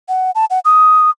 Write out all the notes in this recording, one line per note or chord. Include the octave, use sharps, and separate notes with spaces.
F#5
A5
F#5
D#6